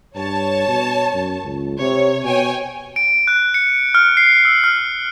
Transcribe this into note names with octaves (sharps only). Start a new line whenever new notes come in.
G2 C#5 A5
B2
F#2
C#2
C3 C#5
B2 C#5 G5 G#5
D7
F#6
C#7
F6
C7
E6
F6